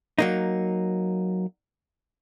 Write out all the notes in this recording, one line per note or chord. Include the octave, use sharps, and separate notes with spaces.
F#3 A#3 D#4